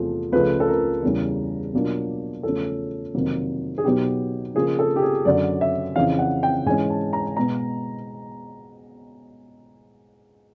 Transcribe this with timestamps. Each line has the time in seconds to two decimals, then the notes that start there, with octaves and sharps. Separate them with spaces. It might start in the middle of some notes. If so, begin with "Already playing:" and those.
Already playing: E2 C3 F3 A3
0.32 C#2 C#3 F3 A3 B4
0.60 A4
0.68 A#4
1.03 E2 C#3 E3 G3
1.73 B2 F#3 A#3 D4 F4
2.43 E2 C#3 F3 A3 C#4 A4
3.14 F2 C3 D#3 F#3 A#3
3.78 G#4
3.84 B2 F#3 B3 D#4 G4
4.55 C#3 F3 A#3 G#4
4.79 A4
4.96 G4
5.02 G#4
5.25 F#2 D3 F#3 D5
5.61 E5
5.96 F2 C#3 E3 F5
6.19 F#5
6.43 G5
6.66 G#2 E3 G#3 C#4 G#5
6.90 A5
7.13 A#5
7.37 B2 G#3 B3 A#5